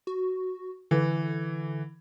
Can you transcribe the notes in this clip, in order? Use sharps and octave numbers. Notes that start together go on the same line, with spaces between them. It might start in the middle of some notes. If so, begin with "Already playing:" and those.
F#4
D3 E3